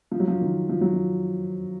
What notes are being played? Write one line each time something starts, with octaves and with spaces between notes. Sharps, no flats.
F3
F#3
F3
D#3
F3
F#3
F3